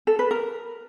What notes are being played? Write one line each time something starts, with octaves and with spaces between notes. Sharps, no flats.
A4
B4
A#4